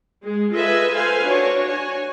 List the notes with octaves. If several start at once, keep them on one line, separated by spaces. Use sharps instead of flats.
G#3 G#4
F4 A4 B4 D#5 E5 G#5
A4 B4 C5 F5 G#5
D4 F#4 C#5
F#4 C#5 G#5